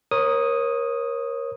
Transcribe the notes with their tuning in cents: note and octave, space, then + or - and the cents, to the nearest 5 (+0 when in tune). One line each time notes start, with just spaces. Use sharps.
A#4 +20 C#5 -30 D#6 +0